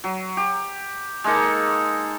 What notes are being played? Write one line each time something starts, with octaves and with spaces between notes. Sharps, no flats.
F#3
G4
G#3 A#3 D#4 A4